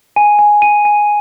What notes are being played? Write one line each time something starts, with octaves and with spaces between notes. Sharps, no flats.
G#5
G#5
G#5 D#7
G#5